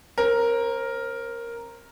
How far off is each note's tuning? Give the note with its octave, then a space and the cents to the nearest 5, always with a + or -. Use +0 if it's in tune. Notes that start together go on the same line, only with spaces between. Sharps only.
C4 +35 A#4 +0